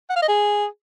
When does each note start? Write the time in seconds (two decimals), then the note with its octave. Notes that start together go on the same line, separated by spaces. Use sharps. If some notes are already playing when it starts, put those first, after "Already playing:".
0.10 F#5
0.16 F5
0.22 D#5
0.29 G#4